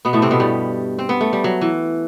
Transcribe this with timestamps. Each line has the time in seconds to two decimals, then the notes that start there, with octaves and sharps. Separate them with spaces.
0.05 B2 B3
0.13 A2 A3
0.22 C3 C4
0.31 B2 B3
0.40 G2 G3
0.99 C4
1.09 B3
1.21 A3
1.33 G3
1.44 F#3
1.61 E3